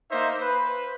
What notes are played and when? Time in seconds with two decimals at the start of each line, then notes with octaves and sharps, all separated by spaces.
0.11 A#3 D#4 C5 E5
0.42 B4 C5